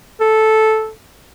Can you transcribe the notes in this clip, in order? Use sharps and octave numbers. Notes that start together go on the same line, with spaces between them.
A4